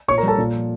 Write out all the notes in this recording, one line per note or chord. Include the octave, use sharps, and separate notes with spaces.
A#2 C#5 C#6
A#4 A#5
G3
A4 A5
A#2
F3